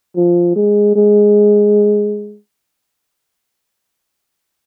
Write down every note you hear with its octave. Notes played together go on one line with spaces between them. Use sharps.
F3
G#3
G#3